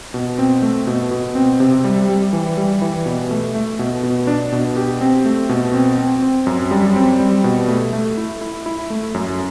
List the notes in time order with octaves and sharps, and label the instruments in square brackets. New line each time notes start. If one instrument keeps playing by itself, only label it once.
[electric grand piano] B2
C4
A3
B2
B2
C4
C3
G3
G3
E3
G3
E3
B2
A3
A3
B2
B2
D4
B2
G4
C4
A3
B2
C4
C4
C4
F#2
G3
C4
G3
B2
A3
A3
E4
E4
E4
A3
F#2